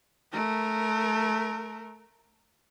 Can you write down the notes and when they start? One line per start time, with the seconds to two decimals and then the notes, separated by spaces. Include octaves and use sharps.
0.33 A3 A#4